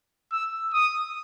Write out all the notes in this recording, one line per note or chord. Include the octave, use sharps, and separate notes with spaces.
E6
D#6